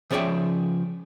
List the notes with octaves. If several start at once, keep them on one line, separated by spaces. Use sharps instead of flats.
C#3 F3 C#5 D5 E5 G5